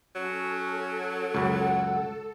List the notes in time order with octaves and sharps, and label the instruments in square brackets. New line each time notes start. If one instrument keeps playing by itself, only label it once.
[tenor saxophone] F#3 [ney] C#4 [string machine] A4
[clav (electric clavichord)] C#2 F#2 [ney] F#5